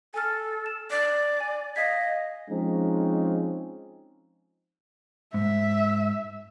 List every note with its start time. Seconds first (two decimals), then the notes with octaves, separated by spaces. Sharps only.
0.14 A4 G#5 F6
0.66 E7
0.90 D5
1.40 G#5
1.76 D#5 F5 G#6 B6
2.50 F3 G#3 C4 C#4 D#4
5.34 G#2 E5